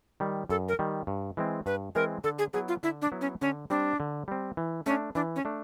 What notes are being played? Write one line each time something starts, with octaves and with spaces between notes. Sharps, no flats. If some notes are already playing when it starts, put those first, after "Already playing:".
D#3 G3
F#2 A4
A#4
D#3 G3
G2
E3 G#3 C4
G2 B4
E3 G#3 C4 A#4
D3 A4
G#4
F#3 B3 E4 G#4
F4
D3 E4
D4
F#3 B3 E4
C#4
D3 C#4
G3 C4 D4
D3
G3 C4
E3
A3 C#4 D4
E3 D4
C#4
A3 D4